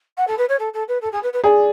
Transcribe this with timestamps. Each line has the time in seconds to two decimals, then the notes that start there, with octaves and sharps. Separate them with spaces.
0.17 F#5
0.28 A4
0.38 B4
0.49 C#5
0.59 A4
0.74 A4
0.88 B4
1.02 A4
1.12 G#4
1.23 B4
1.33 B4
1.44 G#4 D5